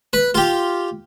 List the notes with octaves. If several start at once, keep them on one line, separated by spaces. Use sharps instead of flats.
B4
F4 G4